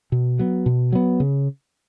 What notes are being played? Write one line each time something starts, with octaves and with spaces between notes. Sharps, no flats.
B2
F#3 B3
B2
F#3 B3
C#3